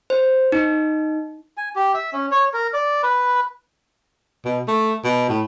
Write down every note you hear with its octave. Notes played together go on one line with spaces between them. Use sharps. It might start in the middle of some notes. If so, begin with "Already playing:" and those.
C5
D#4
G#5
G4
E5
C#4
C#5
A#4
D5
B4
B2
A3
B2
A2